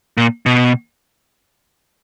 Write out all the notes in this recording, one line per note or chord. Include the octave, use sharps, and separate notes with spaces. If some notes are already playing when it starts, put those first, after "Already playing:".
A#2
B2